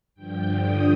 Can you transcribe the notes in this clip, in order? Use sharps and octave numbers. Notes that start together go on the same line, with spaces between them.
G2 D3 F3 G5
D#6